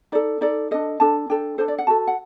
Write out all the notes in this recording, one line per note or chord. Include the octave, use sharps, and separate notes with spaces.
D#4 A4 D5
D#4 A4 D5
D4 A4 D#5
D4 A4 A5
D4 A4 G5
D4 A4 C5
D5
F#5
F#4 A4 A5
F#5